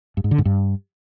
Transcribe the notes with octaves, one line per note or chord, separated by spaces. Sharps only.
G2
G#2
D3
G#2
G2